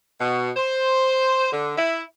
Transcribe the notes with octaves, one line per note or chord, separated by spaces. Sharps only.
B2
C5
D3
E4